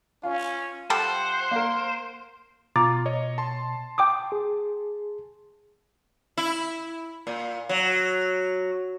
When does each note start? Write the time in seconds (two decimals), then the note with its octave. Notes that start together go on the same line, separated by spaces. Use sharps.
0.23 C#4 F4
0.90 G3 A4 C5 F#5 G5
1.51 A#3 A#4
2.76 B2 F4 A#5 D6 A6
3.06 C#5 D#5
3.38 A5 C6
3.98 G5 D6 D#6
4.32 G#4
6.37 E4
7.27 A#2
7.69 F#3